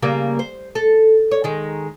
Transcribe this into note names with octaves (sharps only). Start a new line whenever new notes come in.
C#3 G3 A#3
C5
A4
C#5
D#3 G#3